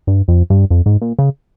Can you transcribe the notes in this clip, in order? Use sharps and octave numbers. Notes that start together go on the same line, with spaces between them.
G2
F2
G2
F2
G#2
A#2
C#3